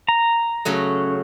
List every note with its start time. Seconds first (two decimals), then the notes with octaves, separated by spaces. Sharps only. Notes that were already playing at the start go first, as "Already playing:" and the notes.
0.08 A#5
0.65 C#3 F#3 A3